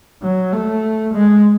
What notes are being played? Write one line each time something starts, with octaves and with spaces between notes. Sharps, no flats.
F#3
A3
G#3